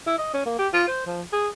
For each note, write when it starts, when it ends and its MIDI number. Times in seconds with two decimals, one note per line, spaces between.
0.07 0.17 64
0.19 0.30 75
0.34 0.41 61
0.46 0.55 58
0.59 0.68 67
0.73 0.87 65
0.88 1.06 72
1.07 1.23 53
1.33 1.48 68